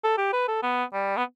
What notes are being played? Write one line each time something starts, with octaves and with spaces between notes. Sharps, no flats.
A4
G4
B4
A4
B3
G3
B3